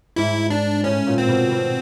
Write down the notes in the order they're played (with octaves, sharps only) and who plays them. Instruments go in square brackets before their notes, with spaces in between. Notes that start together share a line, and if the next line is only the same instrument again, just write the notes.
[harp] G#2 [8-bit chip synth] E4
[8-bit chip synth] D4
[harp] A2 [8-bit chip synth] C#4
[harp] A#2
[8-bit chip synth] C4
[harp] B2
B2